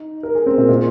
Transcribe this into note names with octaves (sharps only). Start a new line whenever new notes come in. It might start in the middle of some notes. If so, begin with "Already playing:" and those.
Already playing: D#4
A#4
G#4
C4
A#2
A#2